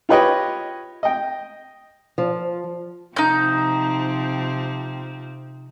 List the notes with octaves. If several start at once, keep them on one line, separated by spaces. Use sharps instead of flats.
F4 G4 B4 C#5 D#5 G5
D#5 G5
F3
C3 F3 C4 D#4 G6